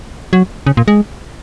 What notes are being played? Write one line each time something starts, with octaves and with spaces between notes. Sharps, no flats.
F#3
C#3
A#2
G#3